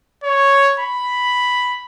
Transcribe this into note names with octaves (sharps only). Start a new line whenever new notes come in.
C#5
B5